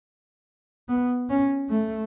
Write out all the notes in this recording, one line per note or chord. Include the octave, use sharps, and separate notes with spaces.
B3
C#4
A3